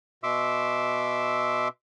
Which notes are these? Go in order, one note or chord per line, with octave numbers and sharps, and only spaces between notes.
B2 E5 C6 D6 E6